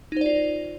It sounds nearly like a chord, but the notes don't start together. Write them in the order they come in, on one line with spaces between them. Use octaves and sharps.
D#4 C5 D5 F4